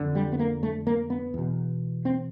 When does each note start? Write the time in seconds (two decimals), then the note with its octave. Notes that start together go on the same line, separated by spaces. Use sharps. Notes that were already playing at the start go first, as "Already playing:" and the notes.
Already playing: F2 D3
0.15 G3
0.32 B3
0.39 A#3
0.63 A3
0.87 A#3
1.10 B3
1.34 E2 B2
2.05 C4